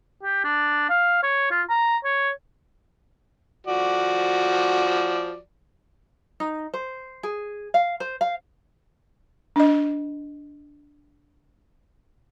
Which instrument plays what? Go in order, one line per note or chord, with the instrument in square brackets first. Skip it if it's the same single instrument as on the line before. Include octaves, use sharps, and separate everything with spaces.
[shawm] G4
D4
F5
C#5
F4
A#5
C#5
[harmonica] F3 F#4 D5
[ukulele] D#4
C5
G#4
F5
C5
F5
[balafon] D4 D#5